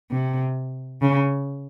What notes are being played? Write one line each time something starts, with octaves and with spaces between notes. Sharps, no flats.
C3
C#3